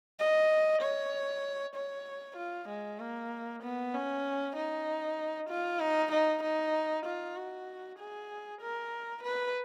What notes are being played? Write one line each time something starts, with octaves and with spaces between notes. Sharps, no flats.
D#5
C#5
C#5
F4
G#3
A#3
B3
C#4
D#4
F4
D#4
D#4
D#4
F4
F#4
G#4
A#4
B4